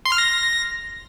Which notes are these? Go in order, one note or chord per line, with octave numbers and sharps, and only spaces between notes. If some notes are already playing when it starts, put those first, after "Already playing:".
C6
F6
A#6